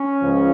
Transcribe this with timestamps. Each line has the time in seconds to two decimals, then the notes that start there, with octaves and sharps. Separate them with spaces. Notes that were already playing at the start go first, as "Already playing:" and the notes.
Already playing: C#4
0.22 C#2 C#3 F3